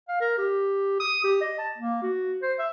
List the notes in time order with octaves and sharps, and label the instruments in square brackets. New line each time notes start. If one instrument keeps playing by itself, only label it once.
[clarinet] F5
A#4
G4
D#6
G4
D#5
A5
A#3
F#4
C5
E5